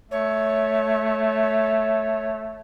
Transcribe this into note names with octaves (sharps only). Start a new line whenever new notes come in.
A3 C#5